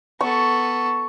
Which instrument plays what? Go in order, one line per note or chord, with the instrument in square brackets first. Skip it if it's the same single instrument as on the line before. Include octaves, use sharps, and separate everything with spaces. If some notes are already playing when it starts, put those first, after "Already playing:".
[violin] B3 A4 [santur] C#6